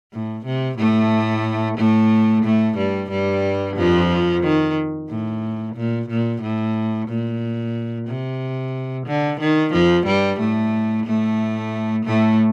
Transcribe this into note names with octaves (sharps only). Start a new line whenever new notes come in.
A2
C3
A2 A3
A2 A3
A2 A3
G2 G3
G2 G3
F2 F3
D#3
A2
A#2
A#2
A2
A#2
C3
D3
D#3
F2 F3
G2 G3
A2 A3
A2 A3
A2 A3